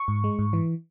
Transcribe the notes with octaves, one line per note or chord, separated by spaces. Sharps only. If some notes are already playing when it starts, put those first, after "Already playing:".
Already playing: C#6
G#2
G#3
G#2
E3